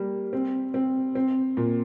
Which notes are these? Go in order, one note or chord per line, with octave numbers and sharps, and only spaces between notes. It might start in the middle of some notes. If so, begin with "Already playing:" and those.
Already playing: G3 A#3
C4
C4
C4
A#2